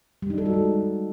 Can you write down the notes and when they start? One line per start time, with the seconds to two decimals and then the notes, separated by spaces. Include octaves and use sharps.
0.22 G3
0.30 D#4
0.38 A4
0.46 F#4
0.53 G#3